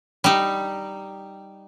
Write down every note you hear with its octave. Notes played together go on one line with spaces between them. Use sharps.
G3 D#4